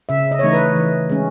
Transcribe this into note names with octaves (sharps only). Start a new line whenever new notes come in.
C#3 E5
D#5
C#5
E3 A3 D#4 D#5
B4
E3
G#3 C#4